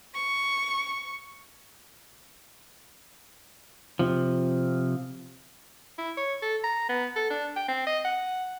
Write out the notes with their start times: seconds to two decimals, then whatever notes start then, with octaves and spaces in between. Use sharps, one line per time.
0.15 C#6
3.99 C3 F3
5.98 E4
6.17 C#5
6.42 A4
6.64 A#5
6.89 B3
7.16 A4
7.30 D4
7.56 G5
7.68 C4
7.87 D#5
8.05 F#5